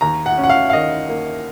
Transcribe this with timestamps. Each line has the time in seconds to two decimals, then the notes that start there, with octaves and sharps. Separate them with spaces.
0.01 D#2 A#5
0.26 F#5
0.38 C#4
0.44 F#5
0.49 F5
0.70 F5
0.73 D#3 D#5
1.09 A#3